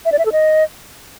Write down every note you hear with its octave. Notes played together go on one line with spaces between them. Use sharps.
E5
D5
E5
A4
D#5